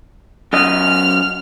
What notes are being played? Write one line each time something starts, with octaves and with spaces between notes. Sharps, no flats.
F#2 D#5 F6